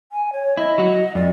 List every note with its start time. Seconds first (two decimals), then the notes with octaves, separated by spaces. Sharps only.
0.12 G#5
0.33 C#5
0.57 E4 D#5
0.78 F#3 F#4
1.15 F2 D5